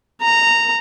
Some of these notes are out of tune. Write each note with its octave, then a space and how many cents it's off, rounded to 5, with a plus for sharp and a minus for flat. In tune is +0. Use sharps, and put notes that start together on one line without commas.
A#5 -15